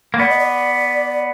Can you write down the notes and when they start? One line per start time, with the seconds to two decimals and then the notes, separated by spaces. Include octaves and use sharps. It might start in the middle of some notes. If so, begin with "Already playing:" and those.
0.14 A#3
0.19 B3 D5
0.30 D#5
0.39 D5